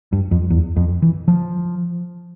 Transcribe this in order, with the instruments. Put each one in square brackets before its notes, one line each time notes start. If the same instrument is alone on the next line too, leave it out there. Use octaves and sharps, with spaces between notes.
[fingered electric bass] G2
F2
E2
F2
E3
F3